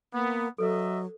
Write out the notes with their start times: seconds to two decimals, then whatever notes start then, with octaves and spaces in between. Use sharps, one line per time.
0.13 A#3 B3
0.58 F#3 A4 B4 D#5 E5